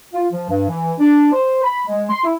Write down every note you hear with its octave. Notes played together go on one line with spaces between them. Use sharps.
F4
F3
G2
E3
D4
C5
B5
G#3
C6
E4